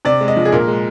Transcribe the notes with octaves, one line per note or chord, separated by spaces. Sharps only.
C3 D5
G#3
D#5
F3
G#4
A#2 A#4
G#3